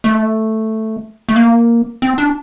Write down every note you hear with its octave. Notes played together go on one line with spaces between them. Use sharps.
A3
A3
A#3
C4
D4